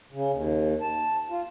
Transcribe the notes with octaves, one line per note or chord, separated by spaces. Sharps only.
C#3
D#2
A5
F4